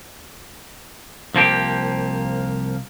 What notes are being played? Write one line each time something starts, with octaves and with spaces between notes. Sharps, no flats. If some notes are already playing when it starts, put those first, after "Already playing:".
C2 F3 A#3 G4